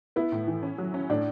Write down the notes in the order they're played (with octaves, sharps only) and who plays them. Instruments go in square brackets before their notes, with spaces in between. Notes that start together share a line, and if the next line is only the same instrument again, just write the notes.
[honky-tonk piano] B3 [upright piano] E4
[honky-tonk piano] A2
E3
C#4
F#3
C#4
[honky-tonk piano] A2 [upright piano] D4